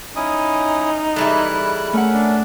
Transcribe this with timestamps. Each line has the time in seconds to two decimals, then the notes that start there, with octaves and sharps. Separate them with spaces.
0.16 C#4 D#4 E4 D#6
1.16 E3 G3 G#3 E4 A4 F#6
1.93 A3 C#4 A#4 E5 F#5
2.14 D4